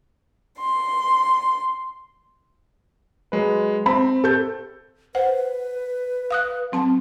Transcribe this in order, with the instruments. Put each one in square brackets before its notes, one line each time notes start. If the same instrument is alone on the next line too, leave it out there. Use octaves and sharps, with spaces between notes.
[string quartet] C6
[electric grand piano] F#3 G#3 B4
[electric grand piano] C4 [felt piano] B5
[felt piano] A4 G6
[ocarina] B4 [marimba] C5 F#5
[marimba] F5 D#6 F#6
F#3 C4 A5